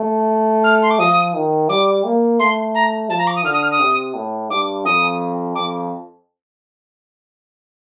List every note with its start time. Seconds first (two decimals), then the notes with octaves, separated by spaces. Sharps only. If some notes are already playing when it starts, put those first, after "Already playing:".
Already playing: A3
0.64 F6
0.82 C6
0.91 D6
0.99 F3 D#6
1.34 D#3
1.69 G3 D6
2.04 A#3
2.39 A3 C6
2.75 A#5
3.09 F3 A5
3.19 A#5
3.27 D6
3.36 D#6
3.45 D3 F6
3.53 D#6
3.62 F6
3.71 D#6
3.79 C3
4.15 A2
4.50 G2 D6
4.85 F2 D#6
5.55 F2 D6